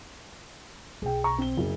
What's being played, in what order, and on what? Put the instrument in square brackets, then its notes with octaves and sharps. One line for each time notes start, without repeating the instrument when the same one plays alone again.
[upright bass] B1 [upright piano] G#4 G5
[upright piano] A#5 C#6
C4 G7
F#1